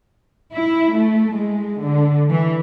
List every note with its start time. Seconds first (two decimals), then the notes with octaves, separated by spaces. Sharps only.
0.52 E4
0.96 A3
1.36 G#3
1.83 D3
2.30 E3